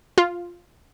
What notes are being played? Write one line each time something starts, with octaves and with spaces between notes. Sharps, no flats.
F4